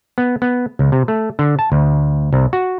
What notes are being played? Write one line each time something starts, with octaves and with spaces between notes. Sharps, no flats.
B3
B3
C#2
C3
A3
D3
A5
D2
C2
F#4